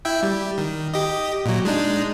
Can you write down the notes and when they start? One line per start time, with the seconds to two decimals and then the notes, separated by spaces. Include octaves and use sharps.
0.05 E4 E5 G5
0.23 G3
0.58 D#3
0.94 G4 D#5
1.45 A#2 F#3
1.65 G#3 D4 D#4